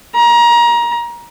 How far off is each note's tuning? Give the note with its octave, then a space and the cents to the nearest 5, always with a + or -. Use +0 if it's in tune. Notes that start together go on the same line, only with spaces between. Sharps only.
A#5 +25